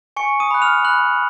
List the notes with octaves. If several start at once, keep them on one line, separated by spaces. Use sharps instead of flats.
G#5 C#6 C#7
D#6 D#7
B5 F#6
F6 F7
B5 F#6 F#7